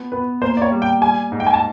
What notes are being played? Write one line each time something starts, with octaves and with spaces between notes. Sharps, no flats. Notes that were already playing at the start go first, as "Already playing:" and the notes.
Already playing: B3
B3 B4
A#3 C5
D5
C#5
G3
G5
G3 G#5
G#2
G5
G#5
A5